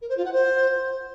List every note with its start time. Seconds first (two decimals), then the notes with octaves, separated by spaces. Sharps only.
0.01 A#4
0.09 C5
0.16 F4
0.24 F#5
0.32 C5